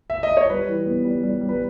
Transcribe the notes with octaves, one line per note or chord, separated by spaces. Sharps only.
E5
D#5
C#5
G3 B4
E3
B3
G3
G3
G3
B4